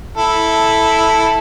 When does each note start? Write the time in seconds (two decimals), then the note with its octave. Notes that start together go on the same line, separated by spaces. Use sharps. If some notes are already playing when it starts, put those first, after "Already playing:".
0.17 E4 A4